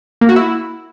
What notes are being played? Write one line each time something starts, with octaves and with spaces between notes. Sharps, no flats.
A#3
F#4
E4